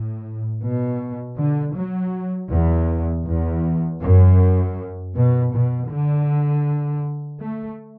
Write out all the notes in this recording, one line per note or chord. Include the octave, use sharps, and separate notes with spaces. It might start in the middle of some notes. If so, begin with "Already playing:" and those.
Already playing: A2
B2
D3
F#3
E2
E2
F#2
B2
B2
D3
A3